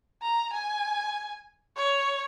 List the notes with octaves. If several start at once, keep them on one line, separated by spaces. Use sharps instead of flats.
A#5
G#5
C#5